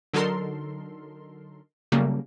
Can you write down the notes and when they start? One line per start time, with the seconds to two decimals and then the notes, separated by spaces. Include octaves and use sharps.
0.13 D3 F#3 D#4 A4 A#4 C6
1.92 C#3 F#3 G3 A3 A#3